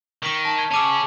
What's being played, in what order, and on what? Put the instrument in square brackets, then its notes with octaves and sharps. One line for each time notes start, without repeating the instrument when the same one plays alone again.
[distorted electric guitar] D#3 [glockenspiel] C#6 B6 D7
[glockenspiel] A5
G#6
[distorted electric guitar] C#3 C#4 [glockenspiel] A5 D6 E6